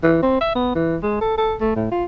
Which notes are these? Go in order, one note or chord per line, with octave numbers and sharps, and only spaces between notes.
E3
C4
E5
B3
E3
G#3
A4
A4
A3
A2
F4